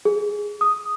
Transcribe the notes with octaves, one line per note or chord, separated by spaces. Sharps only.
G#4
D#6